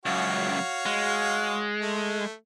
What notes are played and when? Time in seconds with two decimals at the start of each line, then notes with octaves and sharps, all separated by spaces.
0.06 C#2 F#2 F#4 C#5 F5
0.86 G#3
1.82 A3